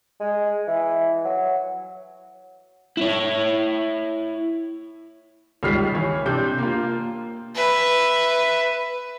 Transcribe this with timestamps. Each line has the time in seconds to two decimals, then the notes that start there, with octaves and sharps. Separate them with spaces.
0.20 G#3
0.67 E3
1.25 F#3
2.97 E4 C#5
5.63 C#2 D#3 G3 F6 B6 C7
5.94 E3 C#5
6.25 C3 D4 G6
6.58 A#3 F4
7.55 B4 E5